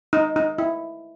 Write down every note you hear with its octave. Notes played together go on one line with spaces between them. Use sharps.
D#4
D#4
E4